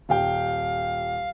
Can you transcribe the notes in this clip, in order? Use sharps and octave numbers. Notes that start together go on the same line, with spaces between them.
D#1 F5 G5